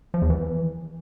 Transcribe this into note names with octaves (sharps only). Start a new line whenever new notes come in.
F3
E2
E3